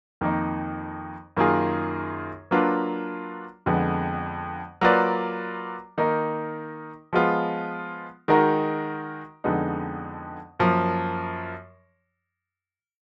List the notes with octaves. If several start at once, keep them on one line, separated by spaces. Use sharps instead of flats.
F2 D#3 A#3 D#4
F#2 D#3 A#3 F4 G#4
F#3 A#3 D4 F4 B4
F2 D3 G#3 B3
F#3 A#3 F4 B4 D5
D#3 A#3 D#4 A#4
F3 G#3 B3 F4
D#3 G#3 D#4 F#4 A#4
F2 D3 G#3 B3 D#4
F#2 F3 A#3